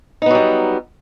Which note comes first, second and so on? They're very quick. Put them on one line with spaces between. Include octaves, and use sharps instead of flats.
D#4 B3 F#3 G3